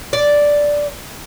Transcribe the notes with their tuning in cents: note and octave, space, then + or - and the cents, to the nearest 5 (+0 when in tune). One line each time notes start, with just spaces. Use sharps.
D5 -5